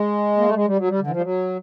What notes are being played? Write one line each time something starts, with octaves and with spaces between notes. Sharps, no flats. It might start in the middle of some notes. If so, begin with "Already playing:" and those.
Already playing: G#3
A#3
A3
G#3
G3
F#3
G3
D3
E3
F3
G3
F#3